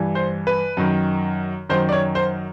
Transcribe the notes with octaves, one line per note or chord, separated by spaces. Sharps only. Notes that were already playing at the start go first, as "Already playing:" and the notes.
Already playing: G2 E3
C5
B4
F#2 D#3
F#2 D#3 C5
D5
C#5
C5